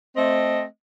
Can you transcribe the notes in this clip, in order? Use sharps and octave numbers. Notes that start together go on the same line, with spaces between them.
A3 C4 D#5